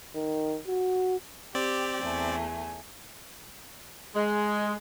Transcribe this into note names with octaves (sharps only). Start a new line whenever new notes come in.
D#3
F#4
C4 G4 D5
E2 A3 G#5
G#3